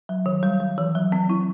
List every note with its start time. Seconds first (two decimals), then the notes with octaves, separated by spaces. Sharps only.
0.09 F#3
0.26 D#3
0.43 G3
0.60 G3
0.78 E3
0.95 F#3
1.12 C4
1.30 E4